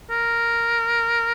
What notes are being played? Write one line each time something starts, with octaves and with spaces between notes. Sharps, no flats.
A#4